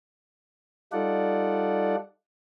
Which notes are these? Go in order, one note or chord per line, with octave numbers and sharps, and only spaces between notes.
G3 D#4 F4 A4 D5 F#5